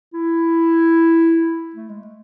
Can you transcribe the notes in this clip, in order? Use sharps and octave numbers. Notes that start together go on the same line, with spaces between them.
E4
A3
G#3
A3